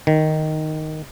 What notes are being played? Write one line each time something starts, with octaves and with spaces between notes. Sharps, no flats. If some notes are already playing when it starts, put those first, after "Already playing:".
D#3